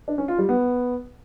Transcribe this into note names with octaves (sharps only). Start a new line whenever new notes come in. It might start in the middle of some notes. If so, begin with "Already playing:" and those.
D4
C#4
F4
G3
B3